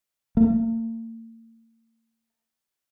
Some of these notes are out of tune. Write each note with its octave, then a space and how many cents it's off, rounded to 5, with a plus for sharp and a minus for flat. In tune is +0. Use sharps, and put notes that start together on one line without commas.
A#3 -45